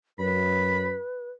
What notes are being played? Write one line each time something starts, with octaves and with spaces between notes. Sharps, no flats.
F#2 B4 B5